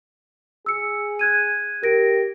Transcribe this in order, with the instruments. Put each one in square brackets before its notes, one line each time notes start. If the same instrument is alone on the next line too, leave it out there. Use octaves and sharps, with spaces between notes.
[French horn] G#4 [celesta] E6 C#7
[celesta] F#6 G#6 D#7
[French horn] G4 [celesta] A#4 A#6 D7